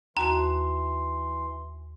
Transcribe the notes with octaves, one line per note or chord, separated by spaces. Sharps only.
D#2 E3 F#4 A5 A#5 C6